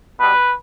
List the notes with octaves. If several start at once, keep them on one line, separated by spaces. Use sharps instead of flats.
B2 G3 B4